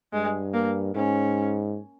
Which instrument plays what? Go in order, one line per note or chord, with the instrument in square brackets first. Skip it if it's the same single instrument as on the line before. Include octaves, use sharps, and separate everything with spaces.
[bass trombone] G2 [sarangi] G#3
[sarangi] A#3
[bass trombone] G#2 [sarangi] C#4